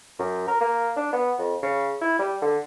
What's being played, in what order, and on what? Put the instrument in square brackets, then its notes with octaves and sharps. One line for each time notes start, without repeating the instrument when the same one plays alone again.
[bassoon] F#2
A#4
A#3
D4
B3
F2
C#3
E4
G3
D3